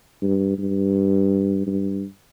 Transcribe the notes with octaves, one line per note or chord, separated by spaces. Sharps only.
G2
G2
G2